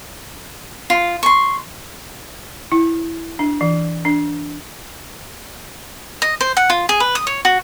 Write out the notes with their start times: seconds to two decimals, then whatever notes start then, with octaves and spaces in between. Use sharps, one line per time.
0.90 F4
1.23 C6 C#6
2.72 E4
3.39 D4
3.61 E3
4.05 D4
6.22 D#5
6.41 C5
6.57 F#5
6.70 F4
6.89 G#4
7.00 B4
7.15 D#6
7.27 C#5
7.45 F#4